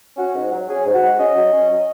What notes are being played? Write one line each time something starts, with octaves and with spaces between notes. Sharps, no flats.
C#4 F#4
G#2
F#3
C#4 G#4
G#2
F#4
G#2
C#4 D#5
F#3
C#4
F#3